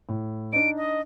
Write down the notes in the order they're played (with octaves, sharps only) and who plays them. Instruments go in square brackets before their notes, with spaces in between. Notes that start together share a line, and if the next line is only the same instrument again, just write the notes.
[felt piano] A2
[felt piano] D4 D#4 [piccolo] D7
[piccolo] D#5